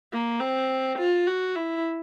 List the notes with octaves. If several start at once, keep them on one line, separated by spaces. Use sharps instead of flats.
A#3
C4
F4
F#4
E4